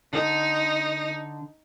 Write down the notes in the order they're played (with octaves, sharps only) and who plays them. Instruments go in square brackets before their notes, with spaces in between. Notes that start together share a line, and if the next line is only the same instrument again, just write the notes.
[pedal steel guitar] D3 [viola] D#4